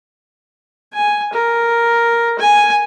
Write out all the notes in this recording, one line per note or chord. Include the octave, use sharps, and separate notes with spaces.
G#5
A#4
G#5